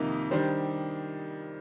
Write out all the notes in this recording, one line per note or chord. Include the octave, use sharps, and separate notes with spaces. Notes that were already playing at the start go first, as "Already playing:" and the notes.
Already playing: F2 C3 D#3 A#3 D#4
D#3 G3 D4 G4 C5